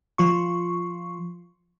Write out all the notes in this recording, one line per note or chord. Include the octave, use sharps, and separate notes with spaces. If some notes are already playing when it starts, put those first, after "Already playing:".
F3 F4 C#6